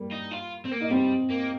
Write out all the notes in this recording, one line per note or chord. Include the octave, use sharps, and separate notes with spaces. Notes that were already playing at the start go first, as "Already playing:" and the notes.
Already playing: G3 A#3
D#4
F4
C4
A#3
D#4
G3 C4
A#3